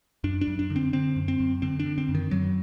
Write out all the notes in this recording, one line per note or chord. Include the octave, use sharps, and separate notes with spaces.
F#2 D4
D4
F#2
D4
D3
C4
D3 C4
F#2
C4
F#2
D3 C4
D4
D3
C4
F#2
D#3
F#2 F#3